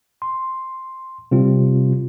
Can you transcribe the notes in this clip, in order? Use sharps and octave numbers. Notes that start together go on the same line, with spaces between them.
C6
C3 G3 C4 F4